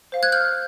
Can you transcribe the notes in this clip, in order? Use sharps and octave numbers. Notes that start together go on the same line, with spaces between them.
C5 F5
F#6 G#6
F6 G6